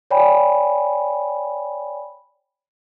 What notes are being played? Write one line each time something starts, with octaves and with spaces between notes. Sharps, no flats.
C#5 D5 G5 G#5 B5